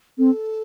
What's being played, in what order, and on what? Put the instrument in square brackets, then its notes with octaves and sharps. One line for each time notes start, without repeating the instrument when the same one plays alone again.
[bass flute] C4 [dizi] A4